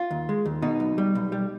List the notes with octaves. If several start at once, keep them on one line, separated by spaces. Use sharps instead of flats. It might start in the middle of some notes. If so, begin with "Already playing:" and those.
Already playing: F4
D#2
G#3
D#2
B2 D#4
B1
G3
B1
G3